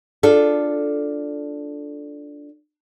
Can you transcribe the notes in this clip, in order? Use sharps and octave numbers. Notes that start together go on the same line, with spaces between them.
D4 F4 A4